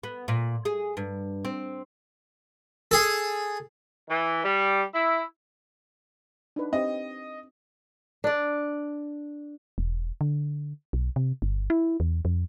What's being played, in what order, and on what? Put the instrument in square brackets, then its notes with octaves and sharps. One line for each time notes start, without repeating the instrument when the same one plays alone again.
[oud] B3
A#2
G#4
G2
C4
[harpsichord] G#4 A4
[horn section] E3
G3
E4
[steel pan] D4 D#4 B4
[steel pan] C4 G4 [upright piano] D#5
[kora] D4 D5
[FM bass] E1
D3
B1
C3
G1
E4
E2
F2